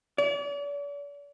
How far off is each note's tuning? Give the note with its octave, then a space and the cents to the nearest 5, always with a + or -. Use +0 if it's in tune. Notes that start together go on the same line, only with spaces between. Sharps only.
D5 -40